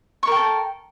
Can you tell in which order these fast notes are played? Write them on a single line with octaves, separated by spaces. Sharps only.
C#6 A#4 G5 A4